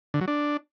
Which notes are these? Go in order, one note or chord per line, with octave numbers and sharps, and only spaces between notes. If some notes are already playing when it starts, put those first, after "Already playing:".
D3
F#3
D4